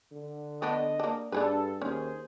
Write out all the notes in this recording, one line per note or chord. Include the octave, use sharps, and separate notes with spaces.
D3
A3 B3 D4 D#5
A#3 D4
G2 D4 G#4 A4 B4
D#2 C#4 G#4 C5